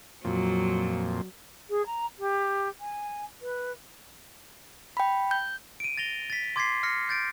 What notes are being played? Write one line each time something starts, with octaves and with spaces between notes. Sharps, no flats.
F2 A#2 F#3
G#4
A#5
G4
G#5
B4
G5 B5
G6
D7 D#7
A6 A#6 F7 G7
A6 B6
C6 D6 G#6 A6 B6 C7
F6 A#6 C7 C#7
G6 A6 D7